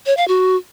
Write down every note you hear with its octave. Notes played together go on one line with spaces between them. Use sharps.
C#5
F5
F#4